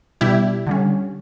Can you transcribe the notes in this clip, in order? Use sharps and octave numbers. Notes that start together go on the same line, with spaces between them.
B2 G3 D4 E4 G4
D3 G3 C#4